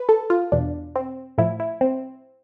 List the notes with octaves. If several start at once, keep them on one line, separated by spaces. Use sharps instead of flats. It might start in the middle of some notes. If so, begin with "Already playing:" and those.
Already playing: B4
A4
F4
E2 B2 D4
C4
A2 F3 E4
E4
C4